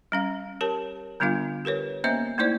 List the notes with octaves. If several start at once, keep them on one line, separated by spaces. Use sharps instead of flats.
G3 C#4 F5
G4 A#4 C#5 A5
D3 G3 B3 D4 F4 F5
G4 A#4 B4 C#5
A#3 B3 C#4 C5 D#5 E5
A3 A#3 D#4 E4 C5 D5